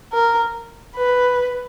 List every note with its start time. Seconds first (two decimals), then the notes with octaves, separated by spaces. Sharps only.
0.13 A#4
0.96 B4